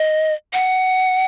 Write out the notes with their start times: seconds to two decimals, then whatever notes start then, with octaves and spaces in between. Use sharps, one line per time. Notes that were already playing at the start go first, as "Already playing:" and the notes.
Already playing: D#5
0.53 F#5